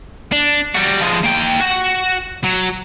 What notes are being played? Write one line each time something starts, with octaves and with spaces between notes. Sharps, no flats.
D4
G3 F#4
F3 G#3
A#3 G5
F#4
F#3